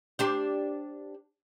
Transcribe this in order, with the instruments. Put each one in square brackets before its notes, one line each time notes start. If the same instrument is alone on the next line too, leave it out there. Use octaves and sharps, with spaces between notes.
[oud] D4 G4 C5